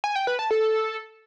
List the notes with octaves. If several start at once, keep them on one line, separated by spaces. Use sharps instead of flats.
G#5
G5
B4
A5
A4